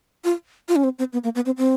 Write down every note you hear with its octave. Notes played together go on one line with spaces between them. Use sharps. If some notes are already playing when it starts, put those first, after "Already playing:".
F4
F4
C#4
C4
C4
B3
A#3
B3
C4
C4